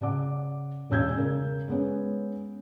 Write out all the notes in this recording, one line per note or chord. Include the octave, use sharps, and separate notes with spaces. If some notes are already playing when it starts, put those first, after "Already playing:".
C#3 D5 F#5 D6
E1 C#4 E6 G6 G#6
C#3 A#4
G#3 B3 C#4